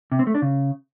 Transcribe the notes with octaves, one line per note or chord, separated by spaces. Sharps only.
C3
C4
A3
D4
C#3